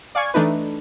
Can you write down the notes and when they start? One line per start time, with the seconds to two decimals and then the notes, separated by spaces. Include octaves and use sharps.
0.15 D5 F5 G#5 C#6 G#6
0.34 E3 A3 D4 D#4 B4